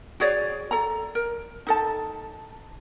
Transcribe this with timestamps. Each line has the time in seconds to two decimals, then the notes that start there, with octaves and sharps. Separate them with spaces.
0.20 F#4 G#4 C#5 D5
0.71 A4 A#5
1.15 A#4
1.67 D#4 A4 A5